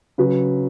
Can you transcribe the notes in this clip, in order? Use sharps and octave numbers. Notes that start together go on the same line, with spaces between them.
C#3 F#3 B4